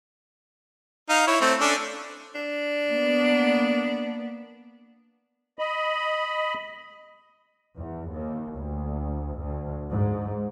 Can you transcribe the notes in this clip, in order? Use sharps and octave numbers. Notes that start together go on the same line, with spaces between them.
D#4 F5
E4 C#5
A3 C4
C#4 D4 A4
D4
A#3 B3
D#5 B5
E2
D#2
D2
D2
G#2